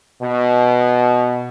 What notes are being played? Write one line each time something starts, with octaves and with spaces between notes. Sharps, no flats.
B2